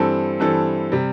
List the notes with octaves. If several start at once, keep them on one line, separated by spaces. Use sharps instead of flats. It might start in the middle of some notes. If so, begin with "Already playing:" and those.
Already playing: G2 E3 C4 A4
G2 E3 C4 A4
C3 G3